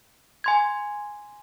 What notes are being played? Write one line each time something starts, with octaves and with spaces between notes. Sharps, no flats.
G#5 C6 G#6